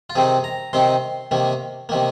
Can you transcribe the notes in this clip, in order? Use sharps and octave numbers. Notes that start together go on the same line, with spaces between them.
F4
C3 D#3 C4 D#4 G#4
A#5
C3 D#3 C4 D#4 C6
C3 D#3 A#3
C3 D#3 A#3